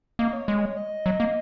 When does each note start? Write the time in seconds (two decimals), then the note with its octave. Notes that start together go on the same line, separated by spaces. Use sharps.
0.19 A#3 D#5
0.33 C#5
0.48 G#3
0.77 D#5
1.06 F#3
1.20 A#3